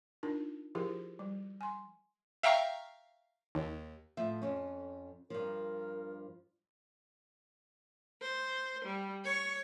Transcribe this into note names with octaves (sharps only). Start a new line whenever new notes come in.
D4 D#4 F4 A#4
F3 E4 F4 G4 G#4 A#4
G3
G#5 C6
E5 F5 G5 A#5 C#6 F6
D#2
A2 F3 E5
F2 C#4
G2 F3 A#4
C5
G3
C#5 C#6